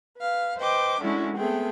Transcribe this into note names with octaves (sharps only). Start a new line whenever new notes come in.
B4 F5
B4 C5 D#5 G5 D6
G#3 A3 C#4 D4 E4 F#4
A3 B3 C4 G#4 G5